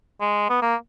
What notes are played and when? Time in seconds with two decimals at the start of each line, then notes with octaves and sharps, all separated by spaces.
0.21 G#3
0.50 B3
0.62 A#3